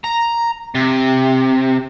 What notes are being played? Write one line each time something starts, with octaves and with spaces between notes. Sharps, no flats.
A#5
C3